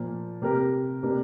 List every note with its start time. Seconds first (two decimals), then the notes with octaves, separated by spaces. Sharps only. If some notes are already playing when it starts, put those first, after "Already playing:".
Already playing: A#2 F3 A#3
0.42 C3 A#3 G4 A#4
1.03 C3 A#3 D4 A#4